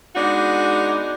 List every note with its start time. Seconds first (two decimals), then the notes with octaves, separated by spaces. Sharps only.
0.15 G#3 B3 D4 D#4 F#4